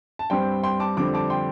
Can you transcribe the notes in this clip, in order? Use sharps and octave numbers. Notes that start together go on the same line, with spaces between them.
A5
G2 G3 C4 G5 C6
G5 C6
A5 D6
F2 D3 G3 C4 D6
A5 D6
G5 C6